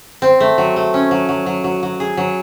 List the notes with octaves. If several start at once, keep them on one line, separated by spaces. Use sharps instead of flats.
C4
A3
F#3
A3
C#4
F#3
F#3
F#3
F#3
F#3
G#4
F#3